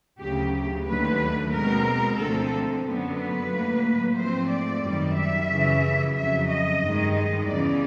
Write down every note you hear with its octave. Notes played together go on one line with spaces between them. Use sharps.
D2 C#3 F#3 G4
G4
D#2 D3 F#3 A3 B4
B2 G#3 C4 A#4
D2 D3 F3 A3 C4 A4
F#2 D3 F#3 B3
B4
A2 F#3 A#3
G#2 F3 A3 C4 C5
D5
F#2 D#3 G3
E5
F#2 C#3 E3
F2 C#3 F#3 E5
D#5
G2 D#3 G#3
D#5
E2 C#3 E3 D5